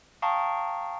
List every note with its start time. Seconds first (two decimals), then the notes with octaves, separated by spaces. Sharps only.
0.22 F5 G5 A5 A#5 C#6 D#6